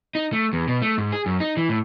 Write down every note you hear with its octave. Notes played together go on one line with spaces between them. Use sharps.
D#4
A3
E2
B2
A3
G#2
G#4
F#2
D#4
E3
A2